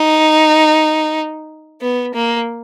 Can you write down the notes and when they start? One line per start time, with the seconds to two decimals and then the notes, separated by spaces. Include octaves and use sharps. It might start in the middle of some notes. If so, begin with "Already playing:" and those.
Already playing: D#4
1.81 B3
2.14 A#3